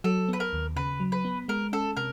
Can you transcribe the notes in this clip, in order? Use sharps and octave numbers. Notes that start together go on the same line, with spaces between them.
F#3 A4
B3 B4
A#4
D#2
C#3 B4
F#3
B4
B3
G#3 A#4
C#4 A4
C3 A#4